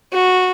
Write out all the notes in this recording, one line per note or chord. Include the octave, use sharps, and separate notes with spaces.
F#4